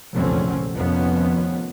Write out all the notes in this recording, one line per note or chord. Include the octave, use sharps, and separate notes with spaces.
F1 A#1 E2 D3 C4 C#4
F1 F2 D#3 F3 B3 C#4